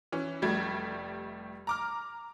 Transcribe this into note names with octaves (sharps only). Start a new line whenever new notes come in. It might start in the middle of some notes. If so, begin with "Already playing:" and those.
E3 C#4
F1 G3 A3 G#6
A#5 D6 F6